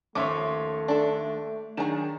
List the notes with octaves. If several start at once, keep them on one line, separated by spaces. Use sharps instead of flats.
D#2 F3 A3 C#4 C#5 E5 C6 D6
D4 A4
D#3 F#3 D4 G#4 A#5 E7